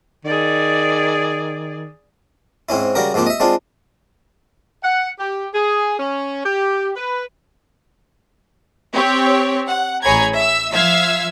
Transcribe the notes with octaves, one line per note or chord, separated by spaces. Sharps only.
D#3 G#4 D5
G#2 C4 C#4 E4
C#3 G3 F#4 G4 A#4
G#2 F3 A#3 C4 G4
D#5 E5
G#3 C4 D4 F4
F#5
G4
G#4
C#4
G4
B4
C4 G4 C#5
F#5
A1 G#4 C#5 A#5 B5 G#6
E5 E6
F3 E5 F5 E6 G#6